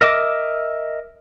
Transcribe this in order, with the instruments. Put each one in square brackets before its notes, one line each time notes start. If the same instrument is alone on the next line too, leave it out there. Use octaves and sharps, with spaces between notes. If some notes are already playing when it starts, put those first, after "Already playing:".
[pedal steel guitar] A#4 D#5 E5 D6